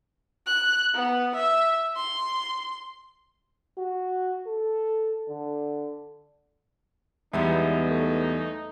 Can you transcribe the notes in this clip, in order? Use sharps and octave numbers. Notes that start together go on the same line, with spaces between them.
F#6
B3
E5
C6
F#4
A4
D3
E2 G3 G#3 B3 D#4 E4
A3